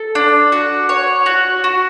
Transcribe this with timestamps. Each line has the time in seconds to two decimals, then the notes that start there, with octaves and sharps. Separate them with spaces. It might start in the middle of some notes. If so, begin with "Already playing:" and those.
Already playing: A4
0.15 D4
0.52 F#4
0.89 C#5
1.26 F#4
1.64 F#4